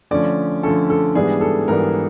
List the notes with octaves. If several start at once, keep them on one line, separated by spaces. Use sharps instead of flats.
D3 F3 A3 C#4 D5
D3 F3 A3 C#4 A4
A4
G#2 E3 G3 B3 D4 G#4
A4
G#2 E3 G3 B3 D4 A#4